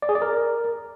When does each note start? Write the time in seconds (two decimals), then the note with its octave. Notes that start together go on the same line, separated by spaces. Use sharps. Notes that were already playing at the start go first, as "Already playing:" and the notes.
0.02 D5
0.09 G#4
0.15 D5
0.22 A#4